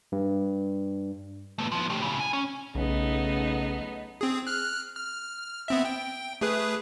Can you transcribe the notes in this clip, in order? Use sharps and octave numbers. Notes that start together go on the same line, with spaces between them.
G2
A3 B3
F3 B3
A3 G4
A2 C#3
G#5
C#4
B1 C#3 A3 B3 D#4
C4 G#4
F6 F#6
F6
B3 C4 E5
G5
A3 G#4 B4